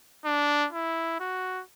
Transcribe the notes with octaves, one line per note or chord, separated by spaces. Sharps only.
D4
E4
F#4